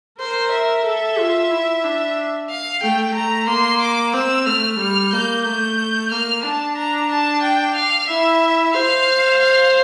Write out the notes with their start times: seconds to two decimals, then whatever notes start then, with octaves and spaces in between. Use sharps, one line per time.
0.20 A#4 C5
0.52 E5
0.85 A4
1.19 F4
1.51 E4
1.84 D4
2.50 F5
2.82 A3 G5
3.15 A3 A#5
3.48 A#3 C6
3.81 D6
4.14 C4 E6
4.46 A3 F6
4.79 G3 F6
5.13 A#3 G6
5.45 A3 G6
6.11 A#3 F6
6.43 D4 A5
6.77 A#5
7.10 A5
7.43 G5
7.75 F5
8.08 E4 E5
8.74 C5 F5
9.40 F5